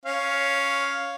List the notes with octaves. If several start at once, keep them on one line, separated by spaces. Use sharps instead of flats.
C#4 F5